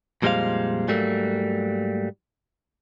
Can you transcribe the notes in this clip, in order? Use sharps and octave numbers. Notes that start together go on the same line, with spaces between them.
F2 A#2 G3 G#3 C5 F5
G#2 F#3 G3 A3 A#3